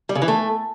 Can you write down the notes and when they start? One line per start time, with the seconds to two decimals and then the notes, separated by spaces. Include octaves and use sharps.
0.09 G3
0.15 C#3
0.22 E3
0.28 A3